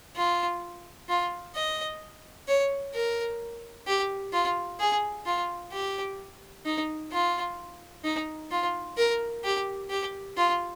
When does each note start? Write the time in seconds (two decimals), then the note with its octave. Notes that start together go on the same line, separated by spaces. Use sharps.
0.16 F4
1.09 F4
1.55 D#5
2.48 C#5
2.94 A#4
3.87 G4
4.33 F4
4.80 G#4
5.26 F4
5.72 G4
6.66 D#4
7.12 F4
8.04 D#4
8.51 F4
8.98 A#4
9.44 G4
9.90 G4
10.37 F4